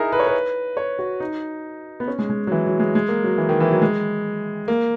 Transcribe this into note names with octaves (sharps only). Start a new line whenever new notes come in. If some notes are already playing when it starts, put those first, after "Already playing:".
Already playing: D#4 E4 G#4 A#4
B4
C#5
B4
C#5
F#4
D#4
B3
C#4
G#3
G#3
F#3
E3
F#3
G#3
G#3
A#3
F#3
E3
D#3
E3
F#3
G#3
A#3